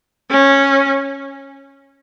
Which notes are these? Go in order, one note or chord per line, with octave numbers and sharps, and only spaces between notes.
C#4